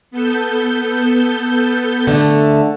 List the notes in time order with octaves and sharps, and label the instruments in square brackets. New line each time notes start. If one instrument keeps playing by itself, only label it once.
[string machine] B3 A4 G6
[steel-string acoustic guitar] D3 A3